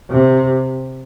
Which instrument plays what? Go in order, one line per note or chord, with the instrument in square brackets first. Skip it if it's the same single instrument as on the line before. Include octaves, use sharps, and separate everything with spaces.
[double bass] C3